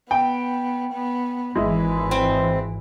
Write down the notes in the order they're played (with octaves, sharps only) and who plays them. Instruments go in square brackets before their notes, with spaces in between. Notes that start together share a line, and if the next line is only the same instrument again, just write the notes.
[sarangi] B3 [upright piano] G5
[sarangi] B3
[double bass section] G#1 G#2 E3 [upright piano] G#3 E4 [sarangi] B4
[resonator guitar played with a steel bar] C4